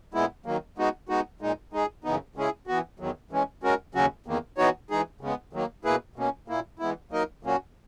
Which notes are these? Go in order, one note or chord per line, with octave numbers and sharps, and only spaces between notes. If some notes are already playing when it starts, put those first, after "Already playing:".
A#2 G#3 B3 E4
D#3 F#3 A#3
G#3 B3 D#4 F#4
G#3 B3 D#4 F#4
A#2 G#3 D#4
G#3 D#4 G#4
F#2 C#3 E3 B3 D#4
C#3 G#3 C#4 E4 G#4
E3 B3 F#4
E2 D#3 F#3
E3 G#3 C#4
G#3 C#4 F#4 A#4
D#2 C#3 F#3 C#4 F#4
E2 D#3 A#3
E3 B3 D#4 F#4 C#5
E3 G#3 D#4 G#4
C#3 G#3 B3
D#3 F#3 A#3
B2 A#3 E4 G#4 B4
B2 A#3 C#4
A#2 A#3 E4
E3 G#3 B3 E4
F#3 A#3 D#4 A#4 D#5
A#2 F#3 A#3 C#4 F#4